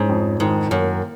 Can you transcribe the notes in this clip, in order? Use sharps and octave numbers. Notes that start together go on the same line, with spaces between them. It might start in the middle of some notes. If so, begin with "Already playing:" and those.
Already playing: G#2 C#4
F2
G#2 D#3
F#2 A#3